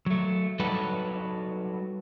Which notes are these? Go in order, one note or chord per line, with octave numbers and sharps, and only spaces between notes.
F#3 A3
F#3 G3 D#4 F#4 A4 B4